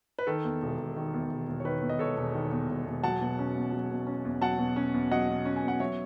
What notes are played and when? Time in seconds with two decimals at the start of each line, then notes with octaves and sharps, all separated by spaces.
0.19 B4
0.27 D#3 A4
0.44 E2
0.62 E1
0.78 E1
0.96 D#3
1.14 E2
1.31 E1
1.48 E1
1.60 C#5
1.65 D#3 B4
1.82 E2
1.89 D#5
1.99 E1 A4 C#5
2.17 E1
2.35 D#3
2.51 E2
2.68 E1
2.86 E1
3.03 F#3 F#5 A5
3.21 B2
3.39 C#4
3.56 E2
3.72 F#3
3.90 B2
4.07 C#4
4.25 E2
4.41 F#3 F#5 A5
4.58 B2
4.76 C#4
4.94 E2
5.11 F#3 D#5 F#5
5.28 B2
5.45 C#4
5.56 G#5
5.63 E2
5.68 F#5
5.80 F#3 C#5 E5